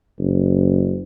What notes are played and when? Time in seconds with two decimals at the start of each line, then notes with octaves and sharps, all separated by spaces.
0.18 F#1